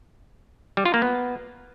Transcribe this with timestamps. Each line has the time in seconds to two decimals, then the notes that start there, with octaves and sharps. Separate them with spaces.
0.77 G3
0.85 F4
0.94 A#3
1.02 B3